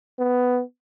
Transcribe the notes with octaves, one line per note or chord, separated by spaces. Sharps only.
B3